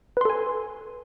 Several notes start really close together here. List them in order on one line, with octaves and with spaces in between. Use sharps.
B4 C6 A4 G#5